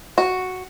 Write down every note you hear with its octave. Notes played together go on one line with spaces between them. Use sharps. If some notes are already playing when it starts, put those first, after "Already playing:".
F#4